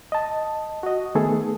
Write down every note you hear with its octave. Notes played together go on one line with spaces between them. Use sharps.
D#5 A5
F#4 D#5
D#3 A3 B3 G#4 A4